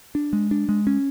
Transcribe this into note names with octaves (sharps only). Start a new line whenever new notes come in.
D4
G#3
D4
G#3
C#4